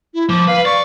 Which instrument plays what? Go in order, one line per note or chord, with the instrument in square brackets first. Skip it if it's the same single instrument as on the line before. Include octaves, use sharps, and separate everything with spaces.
[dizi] E4
[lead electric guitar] F3 [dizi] D6
[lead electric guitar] B4 [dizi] F5
[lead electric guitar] D5 [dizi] C#6